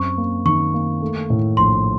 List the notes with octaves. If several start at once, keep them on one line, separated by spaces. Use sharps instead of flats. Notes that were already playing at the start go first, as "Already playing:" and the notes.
Already playing: F#2 C4 C#6
A#3
D#3 C#6
A#3
A3
A2
A#1 C6